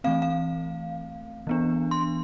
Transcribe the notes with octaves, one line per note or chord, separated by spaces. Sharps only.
E3 A3 C4 F5
F5
E3 B3 D4
C6